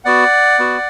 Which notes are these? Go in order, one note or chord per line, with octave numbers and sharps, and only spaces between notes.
B3 F#4 D5 F#5
B3 F#4